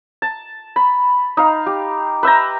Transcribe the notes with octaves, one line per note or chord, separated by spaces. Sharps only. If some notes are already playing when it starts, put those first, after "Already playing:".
A5
B5
D#4 F5
G4
B4 E5 G5 A#5